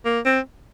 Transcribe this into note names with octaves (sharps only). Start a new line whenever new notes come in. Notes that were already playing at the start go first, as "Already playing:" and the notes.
A#3
C4